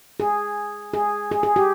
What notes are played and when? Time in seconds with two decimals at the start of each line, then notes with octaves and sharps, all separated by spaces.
0.20 G#4
0.94 G#4
1.31 G#4
1.43 G#4
1.56 G4